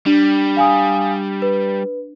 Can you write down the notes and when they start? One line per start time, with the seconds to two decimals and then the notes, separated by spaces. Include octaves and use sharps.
0.06 G3 D4
0.57 F5 G#5 D#6
1.42 B4